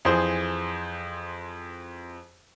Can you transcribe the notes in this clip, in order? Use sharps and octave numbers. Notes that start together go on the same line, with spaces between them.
F2 E3 G#4 C5